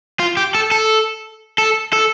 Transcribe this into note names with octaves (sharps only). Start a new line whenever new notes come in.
F4
G4
A4
A4
A4
A4